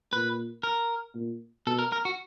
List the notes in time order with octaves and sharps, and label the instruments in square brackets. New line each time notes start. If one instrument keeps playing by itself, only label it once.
[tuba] A#2 [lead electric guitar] B4
[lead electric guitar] A#4
[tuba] A#2
[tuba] B2 [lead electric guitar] A4
[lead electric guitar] A#4
A#4
F#4